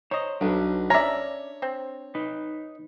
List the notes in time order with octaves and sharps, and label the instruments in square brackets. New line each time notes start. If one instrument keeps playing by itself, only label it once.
[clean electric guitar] C5 A#5 [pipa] C#5 D#5
[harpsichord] B1 [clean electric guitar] D4 B4
[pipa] C#4 D5 [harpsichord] C#5 [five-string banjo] E5 A#5
[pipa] C4
[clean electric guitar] D#4 B4